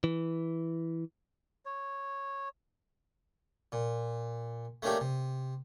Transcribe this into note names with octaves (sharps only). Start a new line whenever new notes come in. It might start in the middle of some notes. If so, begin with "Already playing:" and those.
E3
C#5
A#2
A3 A#3 C#4 D4 G4
C3